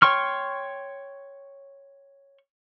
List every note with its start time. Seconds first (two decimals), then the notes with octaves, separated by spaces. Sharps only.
0.02 C#5 G5 C6 C#6 F6